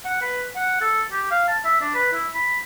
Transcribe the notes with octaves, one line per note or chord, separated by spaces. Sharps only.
F#5
B4
F#5
A4
G4
F5
A5
E5
D4
B4
E4
B5